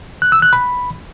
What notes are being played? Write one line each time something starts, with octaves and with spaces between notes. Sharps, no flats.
F#6
E6
F#6
B5